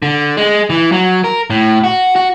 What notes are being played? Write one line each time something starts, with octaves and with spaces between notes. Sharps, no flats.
D3
G#3
E3
F#3
A#4
A2
F#4
F#4